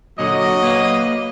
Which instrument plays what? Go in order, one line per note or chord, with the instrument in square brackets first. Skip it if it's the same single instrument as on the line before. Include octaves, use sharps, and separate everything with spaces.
[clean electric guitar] A#2 D3 [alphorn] F#3 [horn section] D#5
[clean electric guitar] A#3 B4 F5